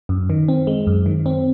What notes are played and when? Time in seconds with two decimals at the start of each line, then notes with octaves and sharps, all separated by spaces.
0.09 F#2
0.30 D#3
0.48 C4
0.67 G#3
0.87 F#2
1.06 D#3
1.26 C4